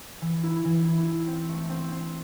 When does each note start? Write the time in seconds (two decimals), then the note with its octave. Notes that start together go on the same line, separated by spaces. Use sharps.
0.21 E3
0.43 E4
0.65 E3
0.85 E4
1.06 E4
1.27 C4
1.49 A3
1.69 C4
1.91 C4